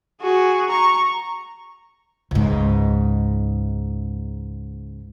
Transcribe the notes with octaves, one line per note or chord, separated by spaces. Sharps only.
F#4 G#4
A#5 C#6
C#2 G#2